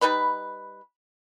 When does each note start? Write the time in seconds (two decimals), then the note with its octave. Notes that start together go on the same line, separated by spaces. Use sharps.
0.01 G3 D#4 B4 B5